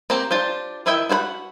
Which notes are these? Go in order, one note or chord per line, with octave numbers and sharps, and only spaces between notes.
A#3 C4 G4 A#5
D4 F4 G4 C5
D#3 E4 D#5 E5 G5
F#4 G#4 C5 F#5 B5